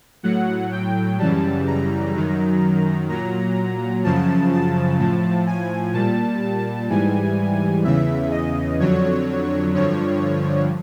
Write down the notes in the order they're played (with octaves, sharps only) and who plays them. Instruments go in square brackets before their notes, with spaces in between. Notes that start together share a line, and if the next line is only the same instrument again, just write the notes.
[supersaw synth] A2 F#3 F#5
G5
F#2 C#3 E3 G3 A5
A#5
F#2 D#3 F#3
A#2 F#3 A#5
F#2 C#3 F3 A5
A5
A2 F3
G#5
A#2 G3 A5
A5
G#2 E3 G3 G#5
E2 C#3 E3 E5
D#5
F2 D3 F#3 C#5
G2 D3 F3 C#5